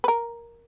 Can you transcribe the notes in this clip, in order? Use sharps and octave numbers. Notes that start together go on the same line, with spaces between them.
B4
A#4